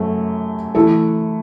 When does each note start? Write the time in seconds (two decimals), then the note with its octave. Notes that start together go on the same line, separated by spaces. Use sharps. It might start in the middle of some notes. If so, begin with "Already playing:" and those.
Already playing: F#2 F#3 A3
0.75 E3 A3 E4 A4